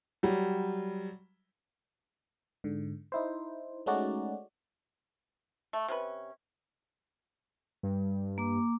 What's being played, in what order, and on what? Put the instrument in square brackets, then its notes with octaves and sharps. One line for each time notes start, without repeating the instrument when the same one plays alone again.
[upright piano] F#3 G3
[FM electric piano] G#2 D3
D#4 E4 C5
G#3 A3 C#4 D#4 F#4 D5
[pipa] A3
C3 C#4 B4
[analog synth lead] G2
[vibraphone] A#3 D6